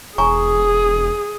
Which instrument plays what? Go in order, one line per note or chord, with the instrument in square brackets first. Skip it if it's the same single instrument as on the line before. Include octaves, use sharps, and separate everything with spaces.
[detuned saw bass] E1 [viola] G#4 [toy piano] G#5 A#5 C#6